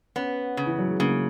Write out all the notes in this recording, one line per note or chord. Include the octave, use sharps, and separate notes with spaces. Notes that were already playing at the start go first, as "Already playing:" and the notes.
B3 C#4
C#3
E3
F#3
G#3
C#3 A#3